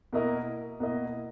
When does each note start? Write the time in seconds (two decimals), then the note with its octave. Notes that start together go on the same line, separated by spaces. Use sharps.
0.13 B2 A#3 E4 A#4 D#5
0.80 B2 A#3 E4 A#4 D#5